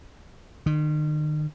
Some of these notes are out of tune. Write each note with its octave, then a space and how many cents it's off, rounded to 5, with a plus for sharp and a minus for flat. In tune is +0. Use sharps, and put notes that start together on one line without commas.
D#3 -40